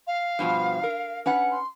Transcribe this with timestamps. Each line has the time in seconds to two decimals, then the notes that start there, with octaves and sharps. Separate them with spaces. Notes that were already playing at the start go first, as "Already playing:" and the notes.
0.07 F5
0.39 G2 B2 F3
0.84 A#4
1.26 C#4 B4 F#5
1.52 C6